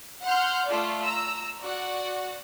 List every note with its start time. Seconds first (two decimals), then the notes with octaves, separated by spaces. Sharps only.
0.23 F#5 C6 F6 G6
0.67 A3 F4 D5
1.01 A#5 E6
1.62 F#4 D5 F#5